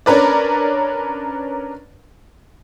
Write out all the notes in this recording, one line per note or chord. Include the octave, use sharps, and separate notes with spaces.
C#4 D4 A#4 B4 D5